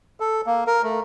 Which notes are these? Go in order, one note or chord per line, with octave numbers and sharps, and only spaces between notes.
A4
A#3
A#4
A3